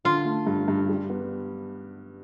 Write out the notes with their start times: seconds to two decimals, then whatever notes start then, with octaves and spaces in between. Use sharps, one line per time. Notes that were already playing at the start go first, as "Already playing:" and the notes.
0.05 D3 F4
0.25 A3
0.46 G2
0.68 G2
0.89 G3
1.10 B3